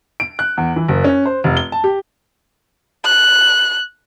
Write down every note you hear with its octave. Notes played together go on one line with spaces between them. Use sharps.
D7
F#6
E2
E3
F#1
C#4
C5
F1
G7
A5
G4
F#6